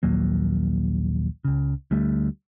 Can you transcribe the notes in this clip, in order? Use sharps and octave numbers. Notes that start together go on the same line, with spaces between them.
A#1 D#2 F#3 A#3
C#2 C#3
D2 G3 A3